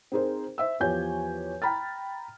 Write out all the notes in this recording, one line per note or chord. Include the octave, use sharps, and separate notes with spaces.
C4 D#4 G#4 A#4 C5
C5 E5 E6
E2 F3 G4 C#5 G#5 G6
G5 A#5 B5 F6 A6